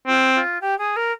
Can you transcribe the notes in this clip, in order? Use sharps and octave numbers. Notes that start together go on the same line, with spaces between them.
C4 F4
F4
G4
G#4
A#4